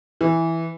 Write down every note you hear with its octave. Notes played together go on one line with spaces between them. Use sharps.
E3